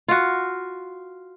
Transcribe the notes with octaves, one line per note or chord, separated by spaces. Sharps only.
F4 F#4